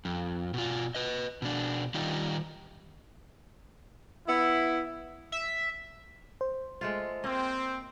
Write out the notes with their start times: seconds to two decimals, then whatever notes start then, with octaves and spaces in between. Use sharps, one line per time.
0.05 F2
0.54 B2 F4
0.95 B4 D#5
1.42 B2 D4
1.94 D#3 G3 D#4 F4
4.28 B3 E4
5.32 E5
6.41 C5
6.81 G#3 A3 F4
7.24 A#3 C4 D#5